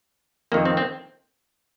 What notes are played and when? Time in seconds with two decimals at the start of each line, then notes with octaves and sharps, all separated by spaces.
0.52 F2 D#3 A#3
0.65 C4
0.77 C4